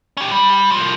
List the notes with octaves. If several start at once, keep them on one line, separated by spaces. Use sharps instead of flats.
C#4 G4
G3
G3
C2 F3